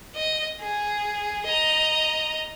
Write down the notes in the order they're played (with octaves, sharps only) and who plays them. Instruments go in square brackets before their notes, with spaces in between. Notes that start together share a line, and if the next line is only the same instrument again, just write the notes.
[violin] D#5
G#4
D#5 A#5